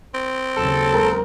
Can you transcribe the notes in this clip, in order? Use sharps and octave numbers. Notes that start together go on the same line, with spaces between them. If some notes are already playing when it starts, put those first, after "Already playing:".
C4
D#2 C#3 F#3 A4
G#3 A#4